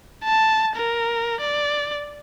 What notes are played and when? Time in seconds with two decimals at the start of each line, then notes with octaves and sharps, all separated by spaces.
0.24 A5
0.76 A#4
1.41 D5